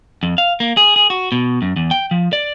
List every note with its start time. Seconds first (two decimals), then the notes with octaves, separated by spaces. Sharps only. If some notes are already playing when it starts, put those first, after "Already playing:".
0.23 F2
0.38 F5
0.60 A#3
0.77 G#4
0.96 G#4
1.10 F#4
1.32 B2
1.62 F#2
1.76 E2
1.91 G5
2.11 F3
2.33 D5